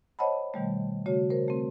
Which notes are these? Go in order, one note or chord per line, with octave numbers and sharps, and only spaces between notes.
C5 C#5 D#5 F#5 A5 B5
B2 D#3 G3 A3
C#3 A3 F#4 C#5
A#4 C5
A3 C4